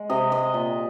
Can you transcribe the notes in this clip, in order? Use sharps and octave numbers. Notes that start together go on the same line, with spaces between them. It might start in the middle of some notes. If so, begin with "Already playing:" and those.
Already playing: G#3
C3 D#5
G#3 D#5
A#2